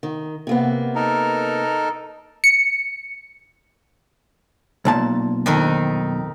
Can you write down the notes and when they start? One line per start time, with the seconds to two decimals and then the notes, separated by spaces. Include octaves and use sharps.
0.03 D#3
0.47 C3 A#3 B3
0.96 D#4 A4 A#4
2.44 C#7
4.85 B1 A#2 A5
5.46 F2 D#3 D#4